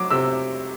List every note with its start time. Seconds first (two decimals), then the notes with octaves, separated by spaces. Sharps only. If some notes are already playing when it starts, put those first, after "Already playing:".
Already playing: F#3 D6
0.10 C3 E6